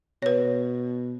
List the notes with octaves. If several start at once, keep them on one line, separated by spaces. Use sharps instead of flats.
B2 B4 C#5